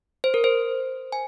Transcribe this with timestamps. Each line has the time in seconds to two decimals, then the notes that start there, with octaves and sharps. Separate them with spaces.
0.24 C5
0.34 A#4
0.44 C5
1.12 G#5